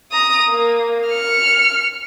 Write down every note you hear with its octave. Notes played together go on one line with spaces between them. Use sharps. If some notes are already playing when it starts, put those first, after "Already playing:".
A#5 D#6
A#3
F6 C#7